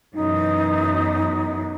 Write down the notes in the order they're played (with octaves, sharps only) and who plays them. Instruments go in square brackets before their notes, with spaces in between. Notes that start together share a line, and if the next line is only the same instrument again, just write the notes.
[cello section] F#2 B2 E3 [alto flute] D#4